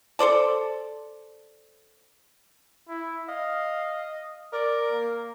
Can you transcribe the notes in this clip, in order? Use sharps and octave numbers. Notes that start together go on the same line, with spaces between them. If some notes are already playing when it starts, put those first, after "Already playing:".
A4 C5 D5 A5
E4
D#5 F5
A#4 D5
A#3